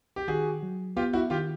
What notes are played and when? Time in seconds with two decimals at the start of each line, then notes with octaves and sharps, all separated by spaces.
0.16 G4
0.28 D#3 F#4 G#4
0.63 F#3
0.96 B3 F4 G4
1.13 E4 F#4
1.30 D#3 F4 G4